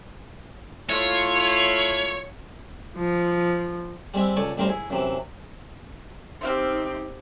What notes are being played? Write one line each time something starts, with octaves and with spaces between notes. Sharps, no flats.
A3 E4 F4 C#5
F3
G3 G#3 C4 E5
C#2 A4 D5 G#5 C#6
A1 F#2 G3 A#4 C5 A#5
E4 G#4
F#2 C3 E3
C4 D#4 G4 C5 E5 F6